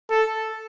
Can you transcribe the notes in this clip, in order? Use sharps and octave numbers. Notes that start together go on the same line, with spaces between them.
A4